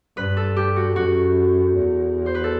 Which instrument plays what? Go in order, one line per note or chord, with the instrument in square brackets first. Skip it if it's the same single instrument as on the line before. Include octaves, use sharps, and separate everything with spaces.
[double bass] G2 [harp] B4
[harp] A4
G4
F#4
[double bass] F#2 [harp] F#4
[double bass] E2
[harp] C5
B4
A4